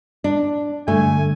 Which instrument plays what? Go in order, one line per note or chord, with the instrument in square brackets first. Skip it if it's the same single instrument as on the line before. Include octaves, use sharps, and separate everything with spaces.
[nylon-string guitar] D4
[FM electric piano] G2 D3 [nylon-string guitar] A3 [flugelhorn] G#5